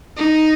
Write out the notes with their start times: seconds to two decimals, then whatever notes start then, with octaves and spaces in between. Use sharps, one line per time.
0.17 D#4